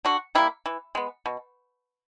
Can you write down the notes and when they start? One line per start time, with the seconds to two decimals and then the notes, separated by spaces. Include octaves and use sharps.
0.05 D3 F#4
0.35 G3 A#3 E4
0.66 E3
0.95 G#3 B3
1.26 B2